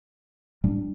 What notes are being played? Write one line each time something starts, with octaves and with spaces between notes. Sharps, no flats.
A2 G3 D4